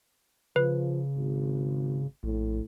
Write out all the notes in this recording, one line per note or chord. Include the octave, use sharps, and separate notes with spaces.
C#3 F3 B4
G#1
A#1 A2